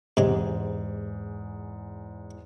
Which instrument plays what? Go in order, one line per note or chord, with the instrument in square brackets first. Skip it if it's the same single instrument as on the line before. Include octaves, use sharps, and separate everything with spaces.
[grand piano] E2 G#2 [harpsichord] C3 G#3